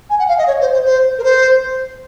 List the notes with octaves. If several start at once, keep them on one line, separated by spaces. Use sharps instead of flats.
G#5
F#5
F5
D#5
C#5
C5
C5
C5
A#4
C5